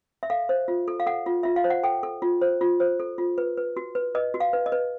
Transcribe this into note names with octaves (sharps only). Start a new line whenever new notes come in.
E5
A4 F5
C5
F4
A4
F5
A4 F#5
F4
F4 E5
F5
C5
F#5
A4 G5
A4
F4
C5
F4
C5
A4
F4
B4
B4
F#4
B4
B4 D#5
F#4
F5
B4
D#5
B4